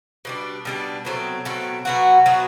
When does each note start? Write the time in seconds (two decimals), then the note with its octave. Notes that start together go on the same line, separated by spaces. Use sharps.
0.25 B2 G3 D4
0.65 B2 G3 D4
1.05 B2 F#3 A3 C4
1.45 B2 F#3 A3 C4
1.85 B2 F#3 B3 F#4
2.26 B2 F#3 B3 F#4